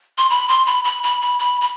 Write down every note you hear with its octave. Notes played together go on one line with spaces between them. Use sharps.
C6
B5
C6
B5
B5
B5
B5
B5
B5